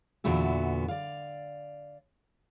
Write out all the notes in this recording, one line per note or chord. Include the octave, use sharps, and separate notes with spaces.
E2 A#2 D3 B3 F#4 E5
D5 F5